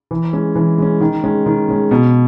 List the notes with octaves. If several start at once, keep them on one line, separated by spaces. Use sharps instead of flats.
E3
G#3 C#4
E3
G#3 C#4
D#3
G#3 C#4
D#3
G#3 C#4
B2